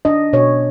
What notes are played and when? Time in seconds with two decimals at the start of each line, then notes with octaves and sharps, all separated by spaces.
0.05 D4 D#5
0.33 B2 C#5